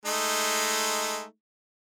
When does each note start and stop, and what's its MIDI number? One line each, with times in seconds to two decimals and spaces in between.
0.06 1.24 56
0.06 1.24 57
0.06 1.24 63